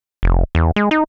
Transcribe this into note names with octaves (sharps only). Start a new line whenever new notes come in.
F1
E2
G#3
D#4